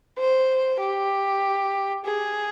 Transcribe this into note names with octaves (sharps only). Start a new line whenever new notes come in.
C5
G4
G#4